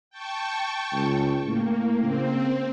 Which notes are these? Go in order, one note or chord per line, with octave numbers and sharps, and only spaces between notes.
G5 A5 C#6
C#2
A2 A#3
C#3 C4